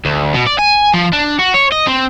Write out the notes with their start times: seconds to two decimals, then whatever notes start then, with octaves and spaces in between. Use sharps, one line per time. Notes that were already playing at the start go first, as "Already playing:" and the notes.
0.05 D2
0.34 B2
0.47 D5
0.59 G#5
0.94 F3
1.13 D4
1.39 F#4
1.54 C#5
1.72 D#5
1.87 C4